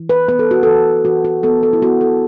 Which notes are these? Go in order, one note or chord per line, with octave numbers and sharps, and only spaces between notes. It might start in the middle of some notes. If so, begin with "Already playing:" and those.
Already playing: E3
B4
B3 B4
A4
F#4
E3 A4
E3 F#4
F#4
B3 A4
A4
E4
B3 F#4
A4